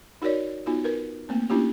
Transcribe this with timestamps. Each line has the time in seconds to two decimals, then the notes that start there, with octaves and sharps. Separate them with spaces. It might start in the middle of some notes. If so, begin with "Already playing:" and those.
0.22 D#4 F#4 A#4 C#5 D5
0.66 B3 D#4 F4 F#4
0.84 A#4 B4
1.29 A3 A#3 C4
1.50 A#3 C#4 D4 E4 F4 G4